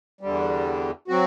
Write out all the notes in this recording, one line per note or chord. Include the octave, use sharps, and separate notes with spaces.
E2 D3 G3
F#3 C4 F#4